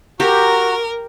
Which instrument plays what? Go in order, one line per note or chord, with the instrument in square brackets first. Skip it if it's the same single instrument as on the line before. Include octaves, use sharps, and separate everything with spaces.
[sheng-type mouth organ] F#4 A#5 [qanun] G4 [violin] A#4